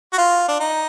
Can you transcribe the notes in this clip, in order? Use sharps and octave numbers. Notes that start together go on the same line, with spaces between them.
F#4
F4
D4
D#4